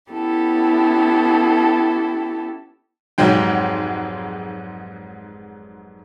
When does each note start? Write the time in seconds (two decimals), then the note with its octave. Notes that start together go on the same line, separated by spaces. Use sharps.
0.11 B3 C#4 E4 G4 A4
3.18 F1 G#2 F#3 G#3 G5